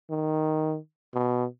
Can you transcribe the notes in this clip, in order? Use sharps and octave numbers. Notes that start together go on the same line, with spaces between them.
D#3
B2